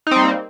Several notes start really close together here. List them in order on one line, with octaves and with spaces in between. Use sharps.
D#4 C4 G3 A#3